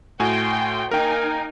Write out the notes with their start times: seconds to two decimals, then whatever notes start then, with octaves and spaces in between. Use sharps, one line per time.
0.20 A2 F#4 G5 G#5 C6
0.91 A#3 D#4 A#4 G5 G#5